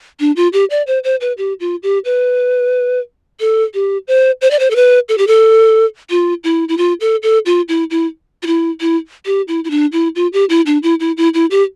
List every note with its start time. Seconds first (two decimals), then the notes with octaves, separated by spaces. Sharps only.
0.20 D4
0.36 F4
0.53 G4
0.70 D5
0.87 C5
1.04 C5
1.21 B4
1.38 G4
1.60 F4
1.83 G4
2.05 B4
3.40 A4
3.74 G4
4.08 C5
4.41 C5
4.51 D5
4.59 C5
4.71 A4
4.76 B4
5.09 A4
5.18 G4
5.27 A4
6.10 F4
6.44 E4
6.69 E4
6.78 F4
7.00 A4
7.23 A4
7.46 F4
7.68 E4
7.90 E4
8.43 F4
8.47 E4
8.81 E4
9.26 G4
9.48 E4
9.64 E4
9.70 D4
9.92 E4
10.16 F4
10.33 G4
10.49 E4
10.66 D4
10.83 E4
11.00 E4
11.17 E4
11.34 E4
11.51 G4